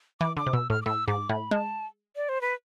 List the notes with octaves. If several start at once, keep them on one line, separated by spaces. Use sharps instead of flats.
E3 D6
D3 D6
C3
B2 E6
A2 F6
D6
A2 E6
G#2 D6
A2 B5
G#3 A5
D5
C5
B4